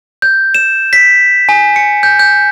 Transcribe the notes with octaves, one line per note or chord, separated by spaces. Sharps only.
G6
E7
B6
G#5
C#7
G6
G6